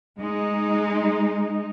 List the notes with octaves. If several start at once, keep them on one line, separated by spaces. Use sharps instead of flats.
G#3 D#4